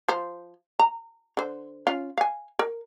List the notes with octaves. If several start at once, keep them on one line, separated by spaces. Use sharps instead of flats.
F3 C5
A#5
D3 C5
C#4 F4 F5
F5 G#5
A#4